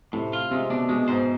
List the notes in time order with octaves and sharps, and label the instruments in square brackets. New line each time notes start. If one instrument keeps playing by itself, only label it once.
[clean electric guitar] A2 [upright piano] C3
[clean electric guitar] F4
[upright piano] C3 [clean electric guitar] G#3
[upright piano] B2 [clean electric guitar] D4
[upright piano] B2 [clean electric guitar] G#3
[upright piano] G#2 [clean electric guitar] C5